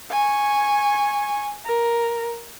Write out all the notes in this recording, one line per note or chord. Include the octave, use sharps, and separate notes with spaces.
G#5 C#6
A#4